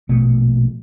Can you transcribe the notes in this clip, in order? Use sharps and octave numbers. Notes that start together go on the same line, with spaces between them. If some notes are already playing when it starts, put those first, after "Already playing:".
A#1 B2 A3